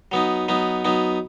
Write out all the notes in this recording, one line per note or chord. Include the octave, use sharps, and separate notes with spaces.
F#3 B3 D#4
F#3 B3 D#4
F#3 B3 D#4